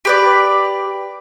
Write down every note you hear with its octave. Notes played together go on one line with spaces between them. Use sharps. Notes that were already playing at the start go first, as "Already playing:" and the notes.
G4 B4 D5